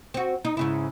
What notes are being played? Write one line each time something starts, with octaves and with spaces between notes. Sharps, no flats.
C4 F#4
D#4
G#2 C#3 E4